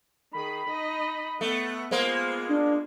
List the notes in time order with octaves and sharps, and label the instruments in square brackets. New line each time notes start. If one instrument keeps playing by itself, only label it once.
[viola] D#3 G#4 [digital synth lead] B5
[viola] D#4 D#5
[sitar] A3 [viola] B3 F#5
[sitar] G#3 A#3 [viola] B3 F4 [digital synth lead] C5
[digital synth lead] D4